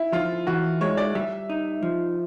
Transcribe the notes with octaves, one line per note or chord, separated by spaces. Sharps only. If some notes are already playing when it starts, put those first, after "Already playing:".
Already playing: E4
F3 F4
E3 F#4
G#3 C#5
D5
G3 E5
D#4
F3